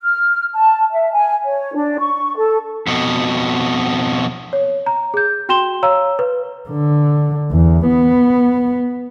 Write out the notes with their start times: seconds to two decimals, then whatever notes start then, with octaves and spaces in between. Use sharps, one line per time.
0.02 F6
0.55 A5
0.92 E5
1.13 G#5
1.45 C#5
1.74 D4
1.99 C#6
2.37 A4
2.87 F2 B2
4.53 C#5
4.86 A#5
5.14 G#4 G6
5.49 F#4 G5 C6 E7 G7
5.83 C#5 F5 A#5 E6
6.19 B4
6.70 D3
7.51 E2
7.87 B3